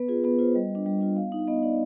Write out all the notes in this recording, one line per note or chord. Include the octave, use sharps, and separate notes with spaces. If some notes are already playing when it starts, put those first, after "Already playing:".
Already playing: B3 B4
F4 G#4
B3 B4
F4 C5
G3 D#5
D4 F4
G3
D4 F4
B3 F5
D#4
B3 D#5
D#4 D5